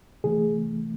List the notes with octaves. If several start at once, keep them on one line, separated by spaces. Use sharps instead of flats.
C3 E3 A3 G#4